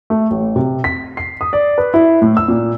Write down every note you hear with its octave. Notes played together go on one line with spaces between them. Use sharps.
A3
A1
C3
B6
C7
D#6
D5
B4
E4
A2
E6
A#2